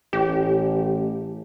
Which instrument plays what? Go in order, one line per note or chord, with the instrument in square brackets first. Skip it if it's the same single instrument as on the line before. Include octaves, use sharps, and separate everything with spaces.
[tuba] A1 [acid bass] G4